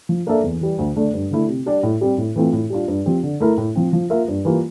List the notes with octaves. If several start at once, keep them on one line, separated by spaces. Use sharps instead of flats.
F3
A#3 D4 A4 E5
E2
E3 G3
D2
D3 A3 D4 A4
G2
D3 A3 E4
C3
G3 D4 G4 D5
A2
G3 C4
A2
E3 A3 C4 F4
A2
G3 D4 F4
G2
F3 C4 G4
D3
A3 E4 A#4
A2
F3 C4
F3
A#3 F4 A#4 E5
G2
E3 G3 A#3 F4